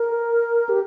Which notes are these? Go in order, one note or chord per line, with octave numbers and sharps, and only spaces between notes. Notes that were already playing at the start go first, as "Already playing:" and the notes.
Already playing: A#4
G4